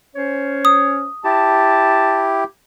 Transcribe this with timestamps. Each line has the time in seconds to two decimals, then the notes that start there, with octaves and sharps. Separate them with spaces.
0.16 C#4 C5 C#5
0.65 D#6
1.25 E4 G4 A5